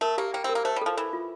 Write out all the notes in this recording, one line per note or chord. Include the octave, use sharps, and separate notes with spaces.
A3 A#4
A#3 G4
A#3 G5
C4
A#4
A#3
A3 C5
G3
F3 A4
E3 A4
F4